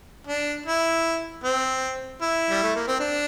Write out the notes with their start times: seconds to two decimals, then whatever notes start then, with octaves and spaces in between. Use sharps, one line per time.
0.27 D4
0.66 E4
1.44 C4
2.21 E4
2.50 G3
2.63 A3
2.75 A#3
2.88 C4
3.00 D4